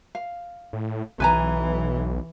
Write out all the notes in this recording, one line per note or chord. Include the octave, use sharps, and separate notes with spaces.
F5
A2
B1 E3 B4 G#5 A#5